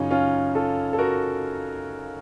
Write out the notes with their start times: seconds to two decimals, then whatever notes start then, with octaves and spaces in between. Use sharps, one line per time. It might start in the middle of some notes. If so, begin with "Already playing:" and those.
Already playing: F#2 C#3 C#4 D#4 F4
0.11 C#4 F4
0.55 F4 A4
0.93 A4
0.98 F#4 A#4